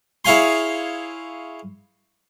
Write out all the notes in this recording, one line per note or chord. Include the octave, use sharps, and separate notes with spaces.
E4 G#4 C#5 F5 G#5 C6